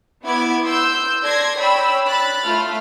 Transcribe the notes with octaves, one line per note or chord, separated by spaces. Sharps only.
B3 E4 D6 G#6
C6 E6 G6
A4 D5 C6 G#6 A#6 C7
C#5 D5 G5 B5 E6
B5 F#6 A6
A3 F4 F6